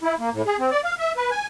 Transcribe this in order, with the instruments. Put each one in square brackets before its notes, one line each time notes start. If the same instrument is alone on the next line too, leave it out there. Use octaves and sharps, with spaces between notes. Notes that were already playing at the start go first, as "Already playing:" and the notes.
[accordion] E4
A#3
A2
G#4
C4
D5
F5
E5
B4
G#5